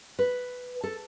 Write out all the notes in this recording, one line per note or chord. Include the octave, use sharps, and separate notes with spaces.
B4
A4